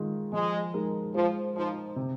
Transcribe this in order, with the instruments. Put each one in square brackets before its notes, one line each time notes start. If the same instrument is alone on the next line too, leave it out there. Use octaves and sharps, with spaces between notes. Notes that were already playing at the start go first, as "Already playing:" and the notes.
Already playing: [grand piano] D#3 G#3 F4
[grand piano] F3 [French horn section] G#3
[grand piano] G#3 D#4 A#4
[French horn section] F3 [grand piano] G#3
[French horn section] F3 [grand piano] D#4 C5
[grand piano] C3